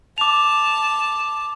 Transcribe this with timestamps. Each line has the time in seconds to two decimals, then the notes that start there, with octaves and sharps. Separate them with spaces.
0.18 A5 D6 F7